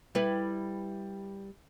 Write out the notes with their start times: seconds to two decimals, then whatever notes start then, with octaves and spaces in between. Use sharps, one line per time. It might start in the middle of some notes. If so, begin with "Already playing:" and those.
0.15 G3 E4 B4